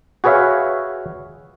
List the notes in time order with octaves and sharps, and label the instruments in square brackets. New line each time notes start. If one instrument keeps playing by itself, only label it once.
[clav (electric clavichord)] F#4 G#4 B4 C#5 E5 F5